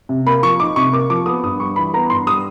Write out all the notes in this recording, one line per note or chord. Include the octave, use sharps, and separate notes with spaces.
C3
A#3 B5
F3 C#6
D#4 D6
C3 C#6
A#3 D6
F3 D6
B3 D#6
G2 D#6
G3 C#6
E3 B5
B3 A#5
G2 C6
G3 D#6